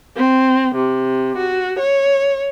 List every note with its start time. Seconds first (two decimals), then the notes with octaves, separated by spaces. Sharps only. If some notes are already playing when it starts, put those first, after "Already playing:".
0.16 C4
0.75 C3
1.36 F#4
1.79 C#5